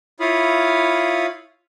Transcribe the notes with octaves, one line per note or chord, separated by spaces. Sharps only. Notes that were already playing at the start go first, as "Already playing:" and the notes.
E4 F4 C#5 F5 B5 D#6